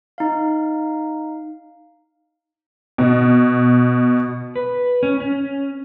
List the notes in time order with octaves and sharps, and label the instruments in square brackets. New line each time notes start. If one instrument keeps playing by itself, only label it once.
[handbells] D#4 F5
[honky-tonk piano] B2
[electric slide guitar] B4
C#4
C#4